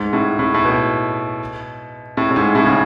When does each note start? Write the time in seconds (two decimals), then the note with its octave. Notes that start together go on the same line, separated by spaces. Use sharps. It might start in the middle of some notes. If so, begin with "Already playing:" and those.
Already playing: G#2
0.13 A2
0.39 A2
0.54 A2
0.64 B2
2.17 A2
2.31 A2
2.36 G#2
2.55 A2
2.65 C#3